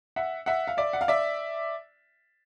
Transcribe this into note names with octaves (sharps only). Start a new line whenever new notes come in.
E5 F#5
E5 F#5
F5
D5 E5
F#5
F5
D5 E5